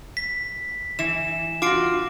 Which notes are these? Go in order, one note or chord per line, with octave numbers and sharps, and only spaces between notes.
B6
E3 E7
F4 F#4 D6 D7